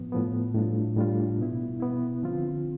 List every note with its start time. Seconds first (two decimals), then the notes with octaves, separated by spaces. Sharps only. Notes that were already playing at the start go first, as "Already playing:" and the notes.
Already playing: A2 F3 B3
0.12 A2 F3 B3
0.54 A2 G3 D4 F4
0.96 A2 G3 D4 F4
1.38 B2 B3 E4
1.80 B2 B3 E4
2.23 D3 F3 C4 F4